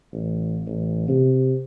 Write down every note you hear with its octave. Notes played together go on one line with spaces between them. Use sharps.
A1
A1
C3